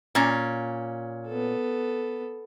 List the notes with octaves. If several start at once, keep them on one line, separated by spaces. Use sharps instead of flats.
A#2 C#4
B3 A4